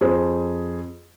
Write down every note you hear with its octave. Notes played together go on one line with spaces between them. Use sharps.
F2 G#4 C5